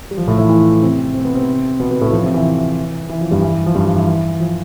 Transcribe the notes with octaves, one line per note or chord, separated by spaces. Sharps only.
G3
F3
A2 A3
E3 E4
E3 E4
C3 C4
C4
B3
C3 C4
B2 B3
B2 B3
A2 A3
F3
C3 C4
E3
E3
F3
G2 G3
E3
F3
G2 G3
F3
E3
E3
F3